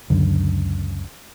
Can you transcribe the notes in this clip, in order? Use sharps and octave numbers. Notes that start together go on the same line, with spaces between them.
C#2 F#2 D3